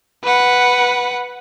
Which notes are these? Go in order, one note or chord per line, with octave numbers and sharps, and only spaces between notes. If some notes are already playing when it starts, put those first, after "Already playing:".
B4 F#5